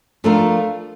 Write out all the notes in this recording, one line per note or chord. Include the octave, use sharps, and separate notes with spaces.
F3 A3 D4 F4 A#4